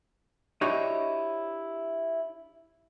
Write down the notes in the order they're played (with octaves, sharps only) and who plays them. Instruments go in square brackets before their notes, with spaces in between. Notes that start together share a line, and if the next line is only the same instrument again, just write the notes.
[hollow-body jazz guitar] D4 E4 F#4 G4 C#5 D#5